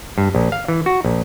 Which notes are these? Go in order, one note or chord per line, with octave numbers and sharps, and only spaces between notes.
G2
A#1
F5
E3
F#4
A#1